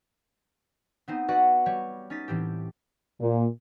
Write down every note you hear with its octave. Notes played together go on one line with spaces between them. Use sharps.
B3 C4 D#4
F#4 B4 D5 E5 F#5
G3 C#5
C#4 D#4 A6 B6
A2 E3 C4 G4
A#2